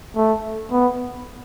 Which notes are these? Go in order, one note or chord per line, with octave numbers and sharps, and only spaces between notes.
A3
B3